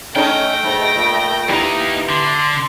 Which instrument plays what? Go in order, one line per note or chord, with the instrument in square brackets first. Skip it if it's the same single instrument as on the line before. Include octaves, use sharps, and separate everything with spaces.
[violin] A3 A#6 [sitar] C#4 D#4 A4 [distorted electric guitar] G5
[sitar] G#2 B2
A#2
[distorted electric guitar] D#2 D#4 [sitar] B3 E4 G4
[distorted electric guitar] D3 [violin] C6